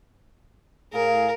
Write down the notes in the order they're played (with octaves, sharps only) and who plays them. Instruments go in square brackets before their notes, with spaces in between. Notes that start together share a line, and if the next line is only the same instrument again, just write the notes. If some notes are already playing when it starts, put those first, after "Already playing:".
[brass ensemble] A2 G#4 F5 [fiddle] A#4